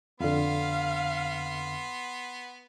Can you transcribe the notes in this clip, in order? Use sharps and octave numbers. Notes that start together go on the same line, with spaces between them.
F2 D3 B3 F5 C6